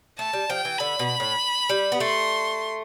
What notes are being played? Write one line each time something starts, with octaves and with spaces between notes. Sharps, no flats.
A3 A5
G3
F3 G5
E3
D3 B5
B2
A2
G3
B3
A3 C6